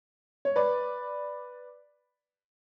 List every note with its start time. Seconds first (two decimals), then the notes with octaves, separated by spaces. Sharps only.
0.45 C#5
0.56 B4 D5